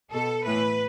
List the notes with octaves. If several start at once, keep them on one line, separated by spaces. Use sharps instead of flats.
B2 A4
A2 E3 B4